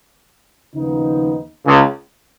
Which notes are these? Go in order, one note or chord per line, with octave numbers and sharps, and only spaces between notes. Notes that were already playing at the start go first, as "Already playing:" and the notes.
D#2 C#3 F3 B3 D#4
C#2 C#3